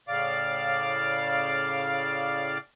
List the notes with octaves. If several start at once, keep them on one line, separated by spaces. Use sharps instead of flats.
A2 C#3 D5 F5 D6